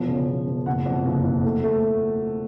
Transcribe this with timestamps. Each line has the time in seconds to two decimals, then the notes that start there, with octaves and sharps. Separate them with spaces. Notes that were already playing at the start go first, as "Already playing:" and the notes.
Already playing: E1 F3
0.08 C#3
0.27 E1
0.47 E1
0.66 F#1 F#5
0.86 F2
1.05 F#1
1.24 F#1
1.44 A3
1.63 A3